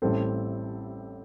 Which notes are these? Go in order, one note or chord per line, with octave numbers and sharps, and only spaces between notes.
A1 A2 G3 C4 A4